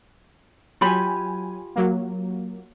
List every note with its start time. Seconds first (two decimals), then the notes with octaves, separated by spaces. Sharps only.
0.81 F#3 F4 G4 G#5 B5
1.76 F#3 A#3